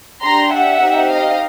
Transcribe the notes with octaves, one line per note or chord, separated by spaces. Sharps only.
D4 G4 A#5 C6
E5 F#5
C4 D#4 G4
D#5 F5